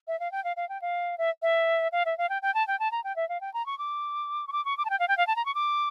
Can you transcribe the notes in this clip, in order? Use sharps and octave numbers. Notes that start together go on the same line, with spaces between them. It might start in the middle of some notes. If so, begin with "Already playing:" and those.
E5
F5
G5
F5
F5
G5
F5
E5
E5
F5
E5
F5
G5
G5
A5
G5
A5
A#5
G5
E5
F5
G5
A#5
C#6
D6
C#6
D6
C#6
D6
A5
G5
F5
G5
F5
A5
A#5
C#6
D6